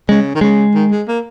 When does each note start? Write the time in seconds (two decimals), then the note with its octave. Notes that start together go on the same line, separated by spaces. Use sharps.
0.09 C#3 G#3
0.35 D#3
0.41 C#3 G#3
0.74 D#3
0.91 G#3
1.08 A#3